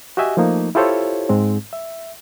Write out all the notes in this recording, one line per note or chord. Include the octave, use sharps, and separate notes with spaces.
F#4 G4 D#5 E5 G#5
F3 A3 A#3 D#4
E4 F4 G4 A4 C5 C#5
G#2 G#3 C4
E5